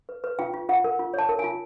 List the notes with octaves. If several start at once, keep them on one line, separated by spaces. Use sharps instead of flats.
B4
B4
F4 G5
F4
F4 F#5
A#4
F4
C#5 A5
A#4
F4 G#5